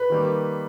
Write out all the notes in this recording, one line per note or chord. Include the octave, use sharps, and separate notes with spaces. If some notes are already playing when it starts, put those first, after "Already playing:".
Already playing: B4
D#3 G3 A#3